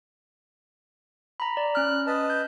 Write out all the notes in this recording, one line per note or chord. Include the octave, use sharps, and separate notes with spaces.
A#5 B5
D5
C#4 F6 F#6
B4 D#5 A5
G6